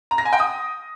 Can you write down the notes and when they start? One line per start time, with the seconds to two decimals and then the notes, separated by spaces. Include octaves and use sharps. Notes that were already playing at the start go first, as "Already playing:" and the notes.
0.11 A#5
0.18 A#6
0.25 G#5
0.33 G5
0.40 D#6